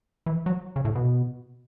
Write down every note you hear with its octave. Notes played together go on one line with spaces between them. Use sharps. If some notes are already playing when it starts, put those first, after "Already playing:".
E3
F#3
C#3
A2
B2